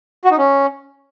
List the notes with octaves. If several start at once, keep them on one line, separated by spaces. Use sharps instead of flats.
F#4
D#4
C#4